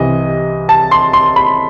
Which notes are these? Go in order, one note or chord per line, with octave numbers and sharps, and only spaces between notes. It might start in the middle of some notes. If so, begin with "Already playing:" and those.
Already playing: C2 C3 E3 D#5
A5
C6
C6
B5